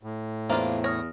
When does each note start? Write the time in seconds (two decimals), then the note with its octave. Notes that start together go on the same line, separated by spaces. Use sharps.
0.03 A2
0.49 E2 A#3 D4 F4 C5 E5 A#5
0.84 G#4 C#5 D#6 F6 A#6